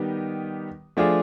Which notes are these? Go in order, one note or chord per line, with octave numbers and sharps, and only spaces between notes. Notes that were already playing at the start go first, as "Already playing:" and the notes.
Already playing: D#3 G3 B3 D#4 G4
F3 A3 D4 F4 G#4